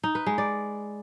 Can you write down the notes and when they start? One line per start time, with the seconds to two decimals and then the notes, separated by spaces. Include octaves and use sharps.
0.04 D#4
0.15 B4
0.26 G#3
0.38 D5